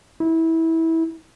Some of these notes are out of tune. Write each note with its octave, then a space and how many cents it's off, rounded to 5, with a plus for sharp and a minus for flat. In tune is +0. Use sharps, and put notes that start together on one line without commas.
E4 -20